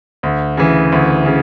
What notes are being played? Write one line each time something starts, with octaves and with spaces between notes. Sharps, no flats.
D2
C#3 E3
D2
C#3